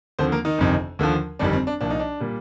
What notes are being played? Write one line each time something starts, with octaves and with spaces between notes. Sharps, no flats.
D#2 D3 F3 C4 C5
A#3 A#4
D#3 D#4
G1 F2 C3
D#2 D3 F3
G1 F2 D#3 G3 D4
C4
D4
C2 A#2 F3 D4
D#4
D4
A#2 G3